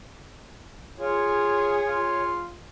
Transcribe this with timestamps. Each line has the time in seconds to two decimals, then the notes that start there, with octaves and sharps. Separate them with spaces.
1.00 F4 G#4 C#5
1.87 F4